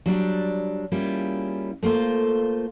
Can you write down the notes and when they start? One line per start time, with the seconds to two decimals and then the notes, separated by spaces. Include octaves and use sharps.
0.06 F#3 G3 D4 D5
0.92 G3 A#3 C#4 E4 F4 G#4
1.83 A3 A#3 F4 C5